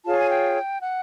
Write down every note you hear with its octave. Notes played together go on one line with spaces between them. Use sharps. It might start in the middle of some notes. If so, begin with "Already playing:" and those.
F4 G#4 C#5 A5
G#5
G5
F#5